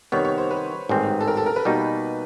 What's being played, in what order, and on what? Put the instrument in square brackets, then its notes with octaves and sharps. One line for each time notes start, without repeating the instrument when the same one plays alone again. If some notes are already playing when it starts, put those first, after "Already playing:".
[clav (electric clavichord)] C3 D#3 G3 B3 [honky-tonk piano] C#5
[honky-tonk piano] C#5
C5
B4
[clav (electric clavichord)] A1 G#2 D#3 G3 C4
[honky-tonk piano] A4
A#4
A4
A#4
B4
[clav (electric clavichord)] B2 G3 A#3 D#4 F#4